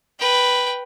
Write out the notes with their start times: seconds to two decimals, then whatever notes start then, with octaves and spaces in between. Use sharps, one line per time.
0.20 B4 G5